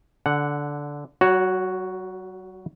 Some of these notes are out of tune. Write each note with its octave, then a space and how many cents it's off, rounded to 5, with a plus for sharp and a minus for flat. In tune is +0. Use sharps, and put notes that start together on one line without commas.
D3 -10 F#5 +0
F#3 +45 F#4 +0 C#5 +0